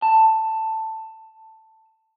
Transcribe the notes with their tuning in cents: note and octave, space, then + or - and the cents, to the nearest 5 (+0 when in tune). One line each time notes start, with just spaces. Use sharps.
A5 +10